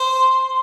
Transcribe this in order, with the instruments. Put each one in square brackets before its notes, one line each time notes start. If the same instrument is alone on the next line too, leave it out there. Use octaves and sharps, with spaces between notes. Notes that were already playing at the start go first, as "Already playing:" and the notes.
Already playing: [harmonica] C5
[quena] C6